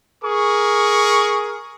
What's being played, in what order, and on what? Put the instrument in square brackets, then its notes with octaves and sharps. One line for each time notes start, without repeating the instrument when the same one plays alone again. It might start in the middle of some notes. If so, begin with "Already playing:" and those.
[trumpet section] G#4 A#4 C#6